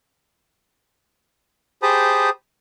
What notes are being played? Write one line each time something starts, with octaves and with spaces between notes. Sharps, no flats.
G4 G#4 C5 A5 B5 D#6